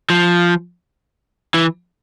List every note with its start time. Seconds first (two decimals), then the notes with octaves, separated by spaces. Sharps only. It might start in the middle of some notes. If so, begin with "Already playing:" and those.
0.10 F3
1.54 E3